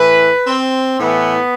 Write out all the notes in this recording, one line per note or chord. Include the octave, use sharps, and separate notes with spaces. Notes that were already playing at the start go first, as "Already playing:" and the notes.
Already playing: A2 E3 B4
C4
A2 E3 B3